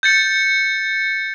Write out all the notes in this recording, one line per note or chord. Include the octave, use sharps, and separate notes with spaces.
G6 A6 C#7